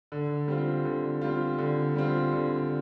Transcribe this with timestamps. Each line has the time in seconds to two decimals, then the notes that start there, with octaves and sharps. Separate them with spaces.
0.12 D3
0.48 G3 C4 F4
0.85 D3
1.21 G3 C4 F4
1.58 D3
1.96 G3 C4 F4
2.33 D3